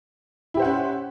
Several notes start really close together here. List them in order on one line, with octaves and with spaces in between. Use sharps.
E4 G4 C5 F#5 C#4